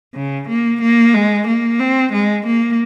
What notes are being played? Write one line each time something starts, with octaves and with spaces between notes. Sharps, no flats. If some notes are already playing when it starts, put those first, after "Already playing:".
C#3
A#3
A#3
G#3
A#3
C4
G#3
A#3